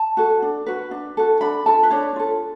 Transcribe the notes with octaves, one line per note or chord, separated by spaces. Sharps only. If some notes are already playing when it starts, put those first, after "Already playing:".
Already playing: A5
F#4 A4
D4
F#4 B4
D4
F#4 A4
D4 B5
F4 A4 A5
B4
D4 C#5
F4 A4